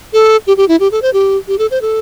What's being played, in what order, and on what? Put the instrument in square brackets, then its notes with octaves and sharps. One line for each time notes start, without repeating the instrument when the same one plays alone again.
[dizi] A4
G4
G4
E4
G4
A4
C5
G4
G4
A4
C5
A4